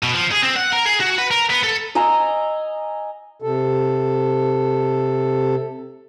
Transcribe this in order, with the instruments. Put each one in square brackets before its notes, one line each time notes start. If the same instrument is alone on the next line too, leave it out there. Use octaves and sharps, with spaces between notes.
[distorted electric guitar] B2
F3
G#4
C4
F#5
A#4
G#4
F#4
B4
A#4
B3
A4
[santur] D#5 G#5 A#5 E6
[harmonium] C3 A4